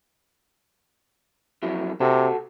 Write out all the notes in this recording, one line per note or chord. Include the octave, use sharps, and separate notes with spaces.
F2 F#3 E4
C3 F#4 A4